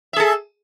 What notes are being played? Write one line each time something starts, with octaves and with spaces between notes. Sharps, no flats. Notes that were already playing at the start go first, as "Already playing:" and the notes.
G#4 A4 E5